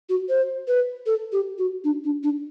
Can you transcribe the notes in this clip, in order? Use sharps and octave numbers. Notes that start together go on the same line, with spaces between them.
F#4
C5
B4
A4
G4
F#4
D4
D4
D4